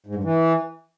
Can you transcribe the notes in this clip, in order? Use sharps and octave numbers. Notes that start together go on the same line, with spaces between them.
G#2
G2
E3